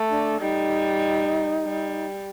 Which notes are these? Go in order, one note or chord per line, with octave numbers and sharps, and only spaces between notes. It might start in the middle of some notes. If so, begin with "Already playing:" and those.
Already playing: A3
D4
G3 D#4
G3